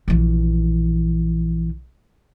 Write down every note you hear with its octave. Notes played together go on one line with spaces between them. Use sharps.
A#1 E3